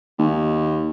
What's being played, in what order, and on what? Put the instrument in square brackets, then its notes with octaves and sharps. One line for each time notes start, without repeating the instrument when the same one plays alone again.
[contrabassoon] D#2